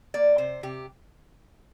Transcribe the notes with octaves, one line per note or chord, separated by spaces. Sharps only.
A#3 D5
C3 C5
C3 G4